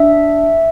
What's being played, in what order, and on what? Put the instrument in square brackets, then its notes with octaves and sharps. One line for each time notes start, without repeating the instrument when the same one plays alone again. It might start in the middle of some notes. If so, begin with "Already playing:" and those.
Already playing: [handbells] D4 E5